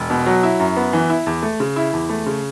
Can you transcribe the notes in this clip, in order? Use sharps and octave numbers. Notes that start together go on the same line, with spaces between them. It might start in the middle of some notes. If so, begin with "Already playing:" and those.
Already playing: E1
B2
F#3
E4
F#2
B3
E3
E4
E2
A3
C#3
E4
E2
A3
C#3